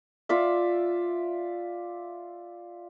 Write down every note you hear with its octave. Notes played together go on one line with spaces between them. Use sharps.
F4 D5 E5